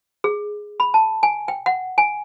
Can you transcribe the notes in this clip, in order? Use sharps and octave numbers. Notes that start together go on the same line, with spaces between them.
G#4
B5
A5
G#5
G5
F#5
G#5